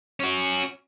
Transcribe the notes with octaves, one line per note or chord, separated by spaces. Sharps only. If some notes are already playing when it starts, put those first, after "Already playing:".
C#4 F#4